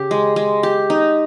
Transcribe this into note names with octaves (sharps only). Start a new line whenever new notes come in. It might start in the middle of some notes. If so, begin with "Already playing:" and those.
Already playing: C#3 G4
G#3
G#3
G4
D#4